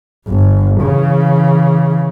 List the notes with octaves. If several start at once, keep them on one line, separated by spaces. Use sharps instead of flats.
G1
C#3 E3